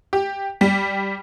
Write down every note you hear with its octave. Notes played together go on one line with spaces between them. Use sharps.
G4
G3